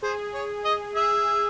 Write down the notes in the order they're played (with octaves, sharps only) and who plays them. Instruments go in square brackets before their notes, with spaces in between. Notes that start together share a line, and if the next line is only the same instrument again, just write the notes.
[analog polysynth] G#4 [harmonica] C5
[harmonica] C#5
D#5
[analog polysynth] G#4 [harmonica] E5